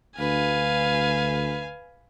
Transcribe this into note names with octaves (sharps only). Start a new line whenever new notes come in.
D2 B4 F5 G#5